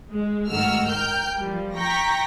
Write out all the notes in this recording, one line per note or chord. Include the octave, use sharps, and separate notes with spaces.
G#3
G#2 D#3 A3 F#4 E6 F6
A#4 G5 F6 G6
F3 G3
G5 A#5 C#6 A#6 B6